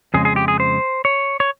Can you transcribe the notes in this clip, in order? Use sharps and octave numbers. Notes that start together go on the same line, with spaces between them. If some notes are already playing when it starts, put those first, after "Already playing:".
F2 C#3 G#3 G#4
G#4
G4
G#4
C5
C#5
C#5